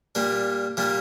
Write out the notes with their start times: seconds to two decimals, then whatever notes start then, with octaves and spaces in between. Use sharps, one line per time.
0.15 A#2 G3 A#3 D4
0.77 A#2 G3 A#3 D4